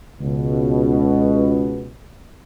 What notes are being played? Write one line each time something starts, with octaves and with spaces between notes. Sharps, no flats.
C#2 B2